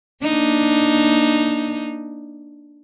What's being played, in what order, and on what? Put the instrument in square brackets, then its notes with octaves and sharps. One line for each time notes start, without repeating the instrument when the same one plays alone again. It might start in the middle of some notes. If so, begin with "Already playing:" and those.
[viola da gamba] A#3 D4 D#4